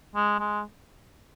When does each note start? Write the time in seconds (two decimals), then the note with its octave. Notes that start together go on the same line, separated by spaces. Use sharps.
0.15 G#3
0.39 G#3